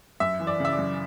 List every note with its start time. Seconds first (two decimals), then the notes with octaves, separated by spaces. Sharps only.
0.20 F#2 E5
0.40 E3
0.47 D5
0.60 C#3 E5
0.73 D5
0.78 F#2